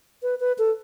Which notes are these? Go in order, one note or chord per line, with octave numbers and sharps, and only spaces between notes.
B4
B4
A4